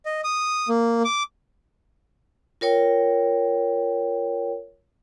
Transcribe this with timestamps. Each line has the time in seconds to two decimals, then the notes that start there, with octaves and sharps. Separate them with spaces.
0.06 D#5
0.24 D#6
0.69 A#3
1.05 D6
2.61 F4 A#4 C#5 G5